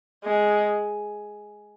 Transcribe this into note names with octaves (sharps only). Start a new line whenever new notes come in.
G#3